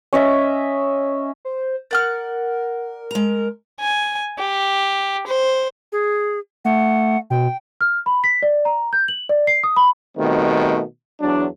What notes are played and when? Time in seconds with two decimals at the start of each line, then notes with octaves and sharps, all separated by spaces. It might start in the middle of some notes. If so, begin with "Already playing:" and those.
0.13 C#4 D#5 E5
1.45 C5
1.91 A#4 D5 F#5 F6
3.11 G#3 A#5
3.80 G#5
4.39 G4
5.27 C5
5.92 G#4
6.65 A3 F#5
7.30 B2 G5
7.81 F6
8.06 B5
8.24 B6
8.43 D5
8.65 A#5
8.93 G6
9.08 F#7
9.29 D5
9.47 C7
9.63 D#6
9.76 B5
10.16 B2 D#3 G3 A3 C4
11.21 E2 F#3 D4